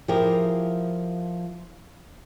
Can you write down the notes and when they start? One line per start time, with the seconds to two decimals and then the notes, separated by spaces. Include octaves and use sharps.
0.08 F3 E4 G4 G#4 A#4